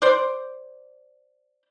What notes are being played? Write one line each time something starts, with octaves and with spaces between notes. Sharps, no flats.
C5 D5